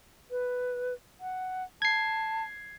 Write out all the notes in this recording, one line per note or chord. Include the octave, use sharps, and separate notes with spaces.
B4
F#5
A5 G#6 C7